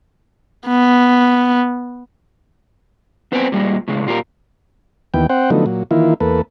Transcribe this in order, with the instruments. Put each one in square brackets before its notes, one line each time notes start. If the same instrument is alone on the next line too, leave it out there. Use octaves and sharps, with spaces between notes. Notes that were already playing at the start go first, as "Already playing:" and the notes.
[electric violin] B3
[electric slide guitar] B3 C4 B4 C5 G5 G#5
A#2 G3 G#3
A2 C#3 G#3
A#2 F4 G4 A#4
[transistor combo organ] D#2 E3 B3 G5
C4 C5 F#5 G5
D3 F3 F#3 A3 B3 D#4
A#2 F#3
D#3 E3 A#3 E4 F4
E2 A#3 A4 B4